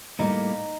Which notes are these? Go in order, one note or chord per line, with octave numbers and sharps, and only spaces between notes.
A2 G3 A#3 D#4